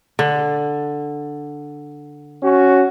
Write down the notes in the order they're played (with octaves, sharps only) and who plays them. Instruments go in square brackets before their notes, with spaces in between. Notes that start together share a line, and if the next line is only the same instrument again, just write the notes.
[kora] D3
[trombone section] C#4 F#4